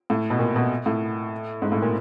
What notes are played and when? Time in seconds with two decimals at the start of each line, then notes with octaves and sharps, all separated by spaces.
0.10 A2
0.30 B2
0.39 A#2
0.56 B2
0.86 A2
1.62 G#2
1.72 A2
1.82 A#2